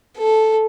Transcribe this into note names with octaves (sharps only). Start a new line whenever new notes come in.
A4